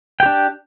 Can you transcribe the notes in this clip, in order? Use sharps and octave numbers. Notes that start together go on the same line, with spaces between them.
D4 G4 G5